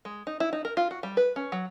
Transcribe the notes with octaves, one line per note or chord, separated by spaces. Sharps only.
G#3
D#4
E4
D#4
A#4
F4
F#4
G3
B4
C#4
F#3